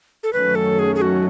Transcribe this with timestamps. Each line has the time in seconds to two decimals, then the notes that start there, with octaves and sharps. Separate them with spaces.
0.23 A4
0.33 F#2 D#3 F#3 A3 C#4 B4
0.55 A4
0.79 G#4
0.95 G#4
1.02 F#4